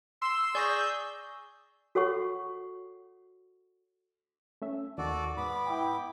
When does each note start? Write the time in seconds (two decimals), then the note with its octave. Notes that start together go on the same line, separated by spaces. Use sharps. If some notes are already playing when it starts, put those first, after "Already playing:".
0.22 C6 E6
0.55 G#4 D5 C#6 G6 A#6
1.95 F#4 A4 C#5 F#5 C#6
4.62 A3 C#4 E5
4.98 D#2 D#3 F#4 A4 D5
5.37 G#2 B3 B5 D6
5.67 E4 G5